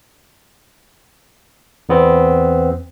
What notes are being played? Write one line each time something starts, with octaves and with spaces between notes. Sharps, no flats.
E2 B3 C4